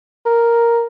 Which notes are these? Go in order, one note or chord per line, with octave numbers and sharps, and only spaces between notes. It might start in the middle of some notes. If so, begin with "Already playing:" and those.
A#4